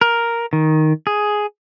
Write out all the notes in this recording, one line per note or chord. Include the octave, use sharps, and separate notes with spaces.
A#4
D#3
G#4